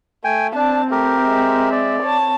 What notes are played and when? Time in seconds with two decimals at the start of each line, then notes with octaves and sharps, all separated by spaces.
0.24 A3 G5 G#5
0.55 C4 D4 A5
0.91 A3 G4 A#4
1.21 G#3 E5
1.72 D5
2.02 C#5 A5